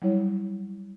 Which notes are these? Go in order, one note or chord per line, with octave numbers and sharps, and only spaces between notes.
F#3 G3 E4 C#5